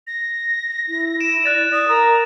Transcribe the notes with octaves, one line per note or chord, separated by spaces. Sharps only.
A#6
E4
D7 E7
D5 F#6 A6 F7
D#6
A#4 A#5